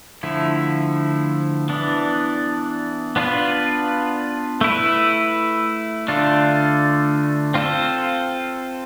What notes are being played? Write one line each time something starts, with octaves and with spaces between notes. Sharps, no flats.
D3 F3 A3 E4
E3 B3 D4
B3 D4 F4 B4
A3 E4 B4
D3 A3 D4 F4
C4 F4 A4 C5